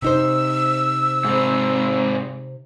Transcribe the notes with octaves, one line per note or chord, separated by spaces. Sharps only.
C3 D#4 C5 E6
G#2 C4